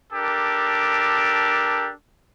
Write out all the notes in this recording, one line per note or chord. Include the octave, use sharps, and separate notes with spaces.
D4 G4 A4 A#4